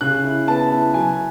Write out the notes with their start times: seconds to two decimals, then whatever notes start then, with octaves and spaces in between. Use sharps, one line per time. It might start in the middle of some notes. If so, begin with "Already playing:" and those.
0.01 C#3 F#6
0.24 E4
0.48 B3 A5
0.71 E4
0.94 F#3 G#5